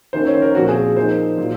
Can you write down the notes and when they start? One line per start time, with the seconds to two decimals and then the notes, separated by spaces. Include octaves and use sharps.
0.13 D#3 A#3 C#4 C5
0.27 C#5
0.35 C5
0.42 A#4
0.55 A#2 F3 C4 F#4
0.69 G#4
0.96 F3 A#3 D#4 C5
1.38 A#2 F#3